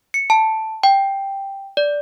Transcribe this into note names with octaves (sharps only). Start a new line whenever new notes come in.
C#7
A5
G5
D5